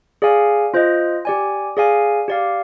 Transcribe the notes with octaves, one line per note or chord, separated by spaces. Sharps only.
G#4 D5 F5 G#5
F4 C5 D#5
G4 D5 G#5
G#4 D5 F5 G#5
G4 D5 F5